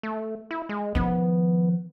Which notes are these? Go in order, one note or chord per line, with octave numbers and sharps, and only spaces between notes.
A3
E4
G#3
D#3 F3 B3